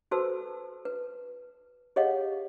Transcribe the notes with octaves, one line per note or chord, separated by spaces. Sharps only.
F#4 A4 B4 C5 A5 E6
B4
G4 G#4 C#5 D#5 F5 F#5